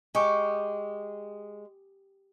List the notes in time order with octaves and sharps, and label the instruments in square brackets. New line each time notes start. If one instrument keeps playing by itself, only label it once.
[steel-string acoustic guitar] G#3 [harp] G4 C#6 D6